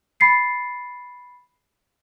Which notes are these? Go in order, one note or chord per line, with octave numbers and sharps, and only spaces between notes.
B5 A6 C7 C#7